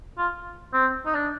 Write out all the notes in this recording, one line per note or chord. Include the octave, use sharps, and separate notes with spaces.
F4
C4
D#4
D4